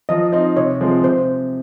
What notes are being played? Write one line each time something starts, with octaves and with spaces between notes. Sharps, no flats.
F3 D#5
C4 D#4 D#5
C3 C#5
F3 G#3 C4
C3 C5